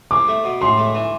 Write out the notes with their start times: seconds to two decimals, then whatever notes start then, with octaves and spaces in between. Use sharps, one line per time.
0.11 C2 D6
0.28 A3
0.44 B2
0.61 A2 C6
0.78 A3
0.95 E3